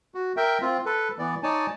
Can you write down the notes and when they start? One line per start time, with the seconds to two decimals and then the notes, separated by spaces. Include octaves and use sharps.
0.15 F#4
0.37 A#4 E5 G5
0.62 C4 F4
0.86 A4 B4
1.19 E3 B3 D5
1.43 D#4 C#5 D5 G#5 A5